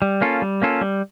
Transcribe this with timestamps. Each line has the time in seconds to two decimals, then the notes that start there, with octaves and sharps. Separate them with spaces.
0.02 G3
0.21 A#3 C#4 F4 A4
0.42 G3
0.62 A#3 C#4 F4 A4
0.81 G3